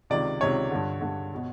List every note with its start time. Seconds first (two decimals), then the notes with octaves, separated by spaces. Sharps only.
0.10 C#2 C3 D#3 D5
0.41 C#2 C3 D#3 C#5
0.71 G2 D3
1.01 G2 D3
1.35 B2